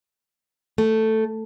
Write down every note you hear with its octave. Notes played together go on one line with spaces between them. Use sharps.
A3